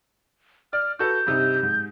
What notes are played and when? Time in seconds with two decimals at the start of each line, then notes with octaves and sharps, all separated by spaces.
0.73 D5 F6
0.99 F#4 A4 B4 G6
1.27 G2 C3 D#4
1.63 G#2